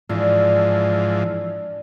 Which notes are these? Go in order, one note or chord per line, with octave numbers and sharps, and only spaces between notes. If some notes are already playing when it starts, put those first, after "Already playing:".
G#2 E3 F3 D4